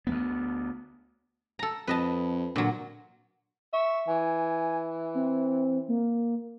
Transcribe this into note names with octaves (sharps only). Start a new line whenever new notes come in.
D2 A#3 B3
A4 A#5
F2 B4 D#5 A5
A#2 D3 F#3
E5 C#6
E3 G#5
C4
A#3